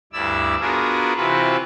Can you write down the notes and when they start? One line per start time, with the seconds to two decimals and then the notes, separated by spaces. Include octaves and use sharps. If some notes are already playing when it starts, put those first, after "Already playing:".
0.13 D2 G2 E4 D5 E6
0.60 B3 D4 F4 F#4 G#4 A#4
1.16 C3 E3 C4 F4 F#4 B4